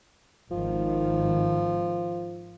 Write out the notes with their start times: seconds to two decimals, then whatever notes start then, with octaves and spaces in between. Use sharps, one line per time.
0.51 G#1 D#3 F3